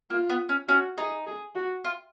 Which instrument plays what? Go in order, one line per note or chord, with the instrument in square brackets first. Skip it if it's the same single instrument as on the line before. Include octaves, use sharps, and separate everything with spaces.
[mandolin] A#3 [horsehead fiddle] F4
[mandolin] B3
C#4
[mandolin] C#4 [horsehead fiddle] F#4
[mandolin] D#4 [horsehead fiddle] G#4
[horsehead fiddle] G#4
F#4
[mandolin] F4